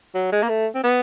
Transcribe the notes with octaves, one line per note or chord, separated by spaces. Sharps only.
F#3
G#3
A#3
A3
C4
B3